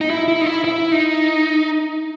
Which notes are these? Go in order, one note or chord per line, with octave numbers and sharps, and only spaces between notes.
D#4
E4
E4
D#4
E4
E4
D#4